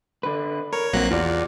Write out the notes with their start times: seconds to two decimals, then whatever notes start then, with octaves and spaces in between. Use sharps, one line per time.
0.23 D3 B4
0.73 A#4 C#5
0.93 A#1 F#3 A#3 C4 F#6
1.11 E2 F4 F#4 D5